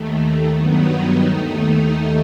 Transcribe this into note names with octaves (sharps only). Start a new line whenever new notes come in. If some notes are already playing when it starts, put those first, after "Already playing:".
Already playing: D#2 D#3 A3
G2 D#3 F#3 B3 D#4
D#2 D#3 A3 D#4